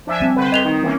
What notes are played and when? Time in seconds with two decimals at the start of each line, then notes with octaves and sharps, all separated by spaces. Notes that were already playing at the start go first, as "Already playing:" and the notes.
0.07 F3 D4 E5 G#5
0.20 G3 C4
0.36 D3 B4 C5
0.52 F2 D#5 F7 G7
0.65 D#3 D#4
0.82 E3 A#3 C#4